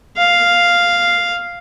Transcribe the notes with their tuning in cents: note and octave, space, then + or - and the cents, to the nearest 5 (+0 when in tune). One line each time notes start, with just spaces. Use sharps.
F5 +0